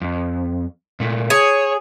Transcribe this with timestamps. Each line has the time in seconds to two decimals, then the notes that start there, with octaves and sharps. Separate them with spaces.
0.01 F2
1.00 A#2 A3
1.30 G#4 C#5